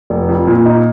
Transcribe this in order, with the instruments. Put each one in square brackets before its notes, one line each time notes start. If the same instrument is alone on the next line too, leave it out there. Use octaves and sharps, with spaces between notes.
[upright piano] F1
F2
A#2
D#4